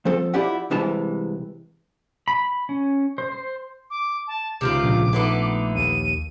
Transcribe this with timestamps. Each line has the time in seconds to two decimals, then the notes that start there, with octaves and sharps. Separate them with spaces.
0.05 F3 C4 A4
0.34 E4 F4 G4 D5 E5 F#5
0.71 C2 C3 E3 G#3 A5
2.28 B5
2.69 C#4
3.18 C5
3.32 C5
3.90 D6
4.27 A5
4.61 C#2 C3 D#3 F4 D6
4.83 A#1
5.13 D3 A3 B3 D#4
5.75 D#2 D#7